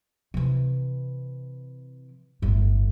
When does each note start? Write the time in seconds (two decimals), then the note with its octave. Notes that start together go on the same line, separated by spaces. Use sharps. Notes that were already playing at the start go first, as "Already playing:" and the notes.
0.34 C3 E3
2.42 G1 A2